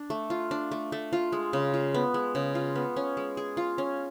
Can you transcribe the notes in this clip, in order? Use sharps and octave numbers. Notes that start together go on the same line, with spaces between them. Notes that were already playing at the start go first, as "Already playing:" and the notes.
Already playing: D4
A3
F4
D4
A3
A3
F4
G#3
C#3
F4
B3
G#3
C#3
F4
B3
C#4
G#3
G#4
F4
C#4